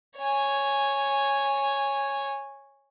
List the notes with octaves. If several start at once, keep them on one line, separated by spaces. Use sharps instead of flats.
C#5 G#5